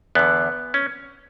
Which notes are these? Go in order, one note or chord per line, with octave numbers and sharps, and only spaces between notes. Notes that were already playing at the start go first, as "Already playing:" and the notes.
E2 D3 B3
C#4